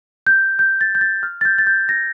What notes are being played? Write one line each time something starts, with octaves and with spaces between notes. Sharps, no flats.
G6
G6
A6
G6
A6
F6
A6
G6
A6
G6
A#6